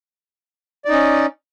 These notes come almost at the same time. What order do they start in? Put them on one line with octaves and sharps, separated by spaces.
D5 D#4 C#4